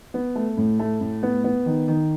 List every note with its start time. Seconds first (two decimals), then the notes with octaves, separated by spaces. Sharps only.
0.14 B3
0.35 A3
0.57 A2
0.79 A3
1.01 A2
1.23 B3
1.44 B3
1.66 D#3
1.88 D#3